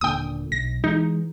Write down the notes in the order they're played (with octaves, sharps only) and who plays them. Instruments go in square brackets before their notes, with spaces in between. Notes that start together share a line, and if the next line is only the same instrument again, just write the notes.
[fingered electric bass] D#1 A#2 D3 [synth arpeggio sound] G5 D#6
[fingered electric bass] B1 [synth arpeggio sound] A#6
[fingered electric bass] E3 G#3 [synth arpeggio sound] D#4